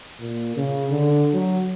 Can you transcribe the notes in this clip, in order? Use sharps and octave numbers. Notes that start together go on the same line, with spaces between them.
A#2
C#3
D3
F#3